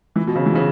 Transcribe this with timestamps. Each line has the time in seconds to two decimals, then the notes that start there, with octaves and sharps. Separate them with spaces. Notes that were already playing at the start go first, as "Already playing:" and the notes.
0.16 E3
0.27 B2
0.36 C#3
0.46 E3
0.55 C#3